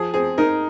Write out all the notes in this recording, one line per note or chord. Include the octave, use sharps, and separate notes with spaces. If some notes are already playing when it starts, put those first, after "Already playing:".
Already playing: F3 G#4
C4 G#4
D#4 A#4